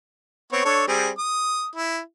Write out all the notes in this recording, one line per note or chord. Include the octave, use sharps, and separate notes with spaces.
B3 C4 C#5
D4 A4 C#5
G3 C4 G#4
D#6
E4